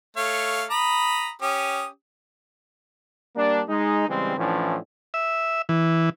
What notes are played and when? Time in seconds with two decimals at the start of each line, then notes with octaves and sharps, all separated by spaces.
0.17 A3 C#5 F5
0.70 A#5 B5 D#6
1.42 C#4 G4 D#6
3.36 G3 A#3 D4
3.68 G#3 D#4
4.07 C#3 E3 G3 G#3 C4
4.37 A2 E3 F3 C#4 D4
5.14 E5
5.69 E3